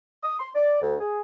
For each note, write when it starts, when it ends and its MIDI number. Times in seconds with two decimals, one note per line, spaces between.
0.24 0.39 87
0.39 0.50 84
0.55 0.81 74
0.82 0.95 38
1.01 1.21 68